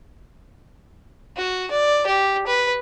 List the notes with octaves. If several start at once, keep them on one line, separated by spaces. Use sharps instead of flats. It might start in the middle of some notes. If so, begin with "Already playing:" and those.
F#4
D5
G4
B4